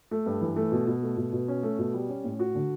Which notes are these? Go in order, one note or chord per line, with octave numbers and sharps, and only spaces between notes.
A3
G2
E3
A3
B2
B2
A3
B2
B2
C#4
A3
B2
G3
C#4
A2
F#4
D3